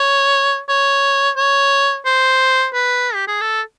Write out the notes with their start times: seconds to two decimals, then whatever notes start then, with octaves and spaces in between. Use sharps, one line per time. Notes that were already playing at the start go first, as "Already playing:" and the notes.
Already playing: C#5
0.69 C#5
1.37 C#5
2.06 C5
2.73 B4
3.14 G4
3.28 G#4
3.41 A4